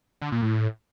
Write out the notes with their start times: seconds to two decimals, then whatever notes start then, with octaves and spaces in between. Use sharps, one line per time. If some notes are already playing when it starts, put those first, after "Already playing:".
0.22 D3
0.32 A#2
0.42 A2